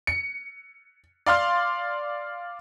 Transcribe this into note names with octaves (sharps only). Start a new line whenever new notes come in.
C#7
D5 F5 C6 F6